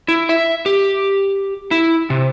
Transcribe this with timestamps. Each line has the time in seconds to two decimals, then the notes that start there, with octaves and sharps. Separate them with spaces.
0.08 E4
0.29 E5
0.66 G4
1.71 E4
2.10 C3